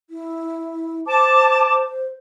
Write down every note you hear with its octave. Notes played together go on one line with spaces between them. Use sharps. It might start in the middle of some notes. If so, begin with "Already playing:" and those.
E4
C5 A5 D6